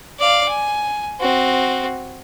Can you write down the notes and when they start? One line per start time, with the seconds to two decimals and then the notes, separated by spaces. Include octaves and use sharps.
0.20 D5 F5
0.48 G#5
1.20 C4 F#4